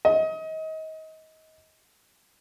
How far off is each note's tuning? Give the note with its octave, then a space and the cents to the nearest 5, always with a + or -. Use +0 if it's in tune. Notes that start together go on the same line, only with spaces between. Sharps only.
D#5 +30